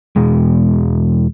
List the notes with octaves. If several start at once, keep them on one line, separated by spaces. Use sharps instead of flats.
E2 B2 G#3